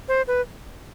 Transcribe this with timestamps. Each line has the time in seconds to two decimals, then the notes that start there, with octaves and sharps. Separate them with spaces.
0.08 C5
0.28 B4